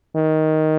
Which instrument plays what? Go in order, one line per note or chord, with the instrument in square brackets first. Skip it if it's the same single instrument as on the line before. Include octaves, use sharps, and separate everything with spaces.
[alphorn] D#3